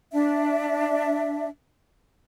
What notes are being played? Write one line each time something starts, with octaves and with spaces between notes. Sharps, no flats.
D4 E5